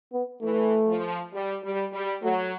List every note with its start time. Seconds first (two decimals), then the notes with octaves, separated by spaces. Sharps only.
0.13 B3
0.42 E3 A3
0.87 F3
1.33 G3
1.63 G3
1.93 G3
2.22 F#3 A3